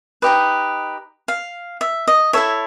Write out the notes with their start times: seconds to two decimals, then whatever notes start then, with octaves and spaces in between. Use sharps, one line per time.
0.22 D#4 G4 B4 D#5
1.28 F5
1.81 E5
2.07 D#5
2.33 E4 A4 C#5 E5